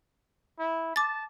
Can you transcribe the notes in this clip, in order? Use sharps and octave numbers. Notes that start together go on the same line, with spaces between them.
E4
A5 D6 A6